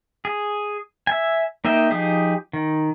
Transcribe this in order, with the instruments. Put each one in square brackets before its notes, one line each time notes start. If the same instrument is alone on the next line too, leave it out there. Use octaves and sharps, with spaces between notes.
[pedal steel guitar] G#4
E5 G#5
A#3 D#4 D#5 E5 G5
F3 D#4 G4 G#4
D#3